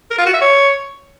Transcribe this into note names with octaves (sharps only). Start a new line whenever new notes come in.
A#4
F4
F#4
E5
C#5